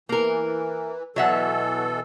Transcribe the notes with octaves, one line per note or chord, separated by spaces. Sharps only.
E3 A#3 A#4
B2 E3 F#3 A4 E5 F#5